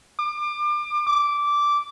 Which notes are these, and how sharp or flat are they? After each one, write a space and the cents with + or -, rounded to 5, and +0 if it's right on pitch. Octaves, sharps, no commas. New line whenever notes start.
D6 +30
D6 -10